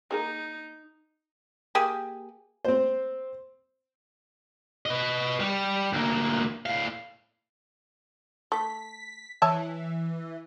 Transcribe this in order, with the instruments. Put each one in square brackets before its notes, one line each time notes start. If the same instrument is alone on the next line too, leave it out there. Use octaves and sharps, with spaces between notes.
[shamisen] A#3 G#4 A#4 [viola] D#4
[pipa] A#3 G4 G#4
[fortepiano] C4 C5
[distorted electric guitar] B4 D#5
G3
D2 A#3
A2 F5
[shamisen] A3 [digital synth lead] B6
[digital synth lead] E3 [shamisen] C#5 E5 A5